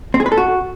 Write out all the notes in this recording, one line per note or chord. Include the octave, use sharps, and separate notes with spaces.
C4
G#4
B4
A4
F#4